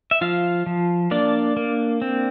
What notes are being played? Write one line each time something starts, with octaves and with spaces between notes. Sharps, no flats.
E5
F3 F4 F5
F3
A#3 D4 D5
A#3
C4